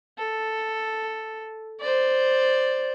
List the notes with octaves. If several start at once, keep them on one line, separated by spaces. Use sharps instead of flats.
A4
C5 D5